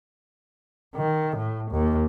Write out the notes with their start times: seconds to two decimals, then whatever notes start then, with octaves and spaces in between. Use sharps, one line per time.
0.95 D#3
1.37 A2
1.71 D#2